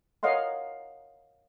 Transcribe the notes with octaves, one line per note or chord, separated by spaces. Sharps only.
A#4 C#5 D#5 F5 F#5 C6